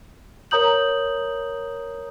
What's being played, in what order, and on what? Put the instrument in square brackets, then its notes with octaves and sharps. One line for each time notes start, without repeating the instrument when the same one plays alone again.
[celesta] A#4 C#5 A#5 D#6 G6 F#7